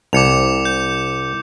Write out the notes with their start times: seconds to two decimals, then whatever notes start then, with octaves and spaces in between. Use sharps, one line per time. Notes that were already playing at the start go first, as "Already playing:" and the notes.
0.13 C2 D6 C#7 F7
0.65 G6